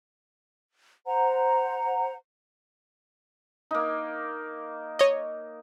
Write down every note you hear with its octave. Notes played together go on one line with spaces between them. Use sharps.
C5 F#5 A#5
A#3 D#4
C#5 D#5